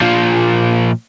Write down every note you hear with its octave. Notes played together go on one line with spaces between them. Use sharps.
A#2 F3